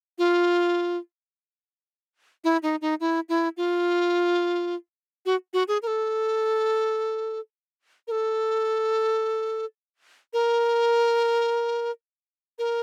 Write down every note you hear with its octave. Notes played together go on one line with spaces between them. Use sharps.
F4
E4
D#4
D#4
E4
E4
F4
F#4
F#4
G#4
A#4
A4
A#4
A4
A#4
A#4